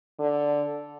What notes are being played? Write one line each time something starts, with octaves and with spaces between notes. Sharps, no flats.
D3